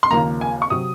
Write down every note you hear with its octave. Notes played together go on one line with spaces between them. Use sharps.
C6
D#2 C#3 F3 A#3 A#5
G#5
C#6
C3 F#3 D#6